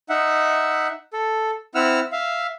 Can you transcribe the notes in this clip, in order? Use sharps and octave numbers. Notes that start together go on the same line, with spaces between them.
D#4 E5 F#5
A4
C4 E4 F#5 E6 F6
E5 F5